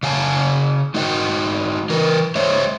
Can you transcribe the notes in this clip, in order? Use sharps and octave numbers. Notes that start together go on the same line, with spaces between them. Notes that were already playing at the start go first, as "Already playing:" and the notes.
C#3 F5 G#5 A5
G#3 D#4 F#4 D#5 F#5 G5
E3 A#4 B4
G#3 C5 C#5 D#5 E5